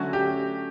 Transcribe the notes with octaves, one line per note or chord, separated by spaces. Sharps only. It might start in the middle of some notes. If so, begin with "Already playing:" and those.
Already playing: D3 F#3 A3 C#4 F#4
G4